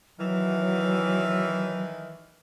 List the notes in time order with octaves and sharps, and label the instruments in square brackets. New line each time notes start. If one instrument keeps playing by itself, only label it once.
[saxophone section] D#3 E3 [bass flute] F#3